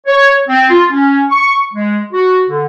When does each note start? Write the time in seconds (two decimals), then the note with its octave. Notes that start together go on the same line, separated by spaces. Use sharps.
0.07 C#5
0.48 C4
0.70 F4
0.90 C#4
1.30 C#6
1.73 G#3
2.13 F#4
2.47 D3